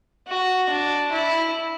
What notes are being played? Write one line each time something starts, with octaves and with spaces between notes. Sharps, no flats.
F#4
D4
E4